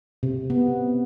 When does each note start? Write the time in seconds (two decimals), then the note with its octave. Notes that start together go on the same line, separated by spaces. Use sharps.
0.23 C3
0.50 B3